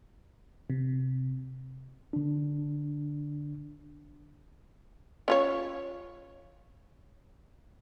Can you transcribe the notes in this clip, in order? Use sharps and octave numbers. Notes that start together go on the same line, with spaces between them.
C3
D3 D4
C#4 F4 C#5